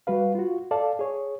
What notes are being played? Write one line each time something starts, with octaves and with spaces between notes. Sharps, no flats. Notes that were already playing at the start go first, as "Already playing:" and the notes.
G3 F#4 B4 F5
F4 F#4
A4 D5 F5 A5
G#4 C#5